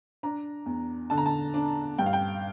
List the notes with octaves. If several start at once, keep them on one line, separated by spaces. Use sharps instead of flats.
D4 A#5
E2
D3 A5
A#5
A5
D4
G2 G5
F5
G5